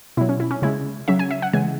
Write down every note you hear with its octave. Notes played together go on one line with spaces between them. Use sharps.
B2 F#3 E4
C#4
E4
C#4
C#3 G#3 E4
C#3 F#3 E5
G#5
E5
F#5
C#3 E3 G#3 G#5